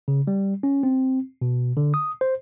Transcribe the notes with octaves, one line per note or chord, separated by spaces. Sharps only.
C#3
G3
C#4
C4
B2
D3
D#6
C5